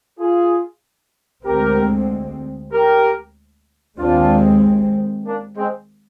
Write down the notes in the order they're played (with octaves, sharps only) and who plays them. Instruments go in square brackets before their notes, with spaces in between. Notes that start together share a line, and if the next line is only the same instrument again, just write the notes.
[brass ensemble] F4 G#4
[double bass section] D2 D3 G#3 C4 [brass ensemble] G4 A#4
[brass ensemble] G4 A#4
[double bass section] D#2 D#3 G#3 C4 [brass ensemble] D4 F4
[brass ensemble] A#3 D4
G#3 C4